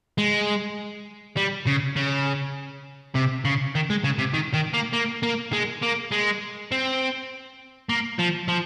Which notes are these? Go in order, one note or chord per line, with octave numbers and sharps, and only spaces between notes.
G#3
G3
C#3
C#3
C3
C#3
D#3
G#3
C#3
C3
D#3
D#3
A#3
A#3
A#3
G#3
A#3
G#3
C4
A#3
F3
F3